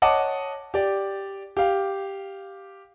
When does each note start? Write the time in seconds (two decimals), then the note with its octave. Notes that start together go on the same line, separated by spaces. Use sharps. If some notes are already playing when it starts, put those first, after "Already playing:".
0.02 C#5 D#5 F#5 A5 D6
0.74 G4 D5
1.57 G4 F5